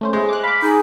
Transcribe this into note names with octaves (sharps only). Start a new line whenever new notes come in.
A3 C#4 C5
G#3 E4 C5
D6 F#6
F5 B5 D6
D#4 G#4